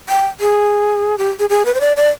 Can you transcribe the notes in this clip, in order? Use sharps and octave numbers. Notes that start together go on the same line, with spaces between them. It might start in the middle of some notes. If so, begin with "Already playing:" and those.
G5
G#4
G4
G#4
G#4
B4
C5
D5
D5